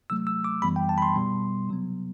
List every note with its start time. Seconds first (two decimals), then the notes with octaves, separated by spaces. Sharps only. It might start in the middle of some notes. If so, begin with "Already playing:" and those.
0.10 C3 F#3 A3 E6
0.27 E6
0.44 D6
0.62 F#2 E3 G3 B3 B5
0.76 G5
0.89 A5
0.98 B5
1.02 C6
1.16 B2 G3 B3
1.68 C3 F#3 B3